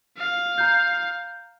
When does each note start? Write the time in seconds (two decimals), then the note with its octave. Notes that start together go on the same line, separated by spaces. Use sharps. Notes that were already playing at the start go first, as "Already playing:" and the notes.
0.17 F5
0.58 A#5 G6